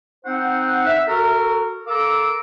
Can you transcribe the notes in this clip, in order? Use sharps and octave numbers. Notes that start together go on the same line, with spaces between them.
C4 D#4 C5 F#5
E5
F#4 A4 A#4
A4 A#4 F5 A#5 D6 E6